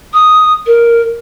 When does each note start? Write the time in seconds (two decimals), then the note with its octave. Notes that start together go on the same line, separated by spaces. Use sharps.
0.13 D#6
0.66 A#4